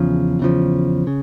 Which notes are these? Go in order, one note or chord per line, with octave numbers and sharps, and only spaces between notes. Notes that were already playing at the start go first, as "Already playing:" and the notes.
Already playing: E2 C#3 F3
E2 C#3 F3
C#3